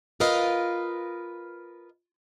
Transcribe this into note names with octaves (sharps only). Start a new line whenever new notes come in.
F4 A#4 B4 D#5 F5